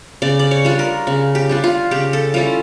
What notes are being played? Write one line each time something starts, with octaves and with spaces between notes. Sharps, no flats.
C#3 D5
D5
C#5
G3 D4 F4
A#4
C#3
G4
G3 D4 F4
F4
C#3 G4
A4
G3 C#4 E4 F4